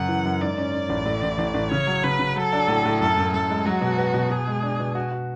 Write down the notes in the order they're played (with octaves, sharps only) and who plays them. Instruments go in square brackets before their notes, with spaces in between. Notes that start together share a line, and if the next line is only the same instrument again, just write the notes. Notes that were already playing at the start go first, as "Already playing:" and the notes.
Already playing: [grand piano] F#2 C#3 [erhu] F#5
[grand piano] E3
F#2
[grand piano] G#2 [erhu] D5
[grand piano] C#4
C#4
A1
A2
A1
A1
A1
[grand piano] C#3 [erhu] C#5
[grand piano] F#3
[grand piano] C#3 [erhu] B4
[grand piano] C#3
[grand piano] F#3 [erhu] A4
[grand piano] D4
A2
A2
[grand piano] F#2 [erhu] A4
[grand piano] F#2
[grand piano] F#2 [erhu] A4
[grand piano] G#3
[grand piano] F#3 [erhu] F#4
[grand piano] B2
B3
B2
[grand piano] B2 [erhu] G#4
[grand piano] G#3
D4
B2
F#4
F#4